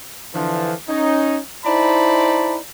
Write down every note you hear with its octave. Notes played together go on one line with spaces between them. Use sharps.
D3 E3 F3
C#4 D#4
D#4 E4 C5 D5 A5 B5